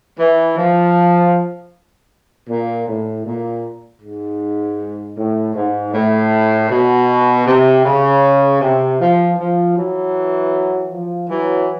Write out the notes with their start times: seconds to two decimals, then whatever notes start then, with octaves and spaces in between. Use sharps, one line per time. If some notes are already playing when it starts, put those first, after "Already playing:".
0.19 E3
0.57 F3
2.48 A#2
2.87 A2
3.25 A#2
4.02 G#2
5.17 A2
5.55 G#2
5.93 A2
6.69 B2
7.46 C3
7.85 C#3
8.61 C3
9.00 F3
9.37 F3
9.76 E3 F#3
10.91 F3
11.29 E3 F#3